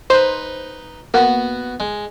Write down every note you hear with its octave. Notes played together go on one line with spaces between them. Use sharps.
D#4 B4 C5
A#3 B3 F#4
G#3